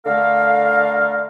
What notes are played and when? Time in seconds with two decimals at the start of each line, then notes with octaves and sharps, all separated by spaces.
0.05 D3 A3 A4 A#4 F5